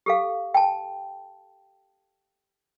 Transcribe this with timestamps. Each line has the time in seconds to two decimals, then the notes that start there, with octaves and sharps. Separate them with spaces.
0.06 G4 A4 F5
0.54 G5 A5